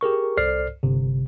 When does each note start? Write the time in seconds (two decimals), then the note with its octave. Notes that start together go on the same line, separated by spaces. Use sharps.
0.01 G4 G#4 A#4 C#6
0.37 C2 A4 C5 D5 F6 C7
0.83 G1 C3